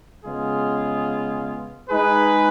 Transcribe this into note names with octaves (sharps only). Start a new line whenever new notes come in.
C#3 G#3 B3 F4 G#4
G#3 D#4 G#4 B4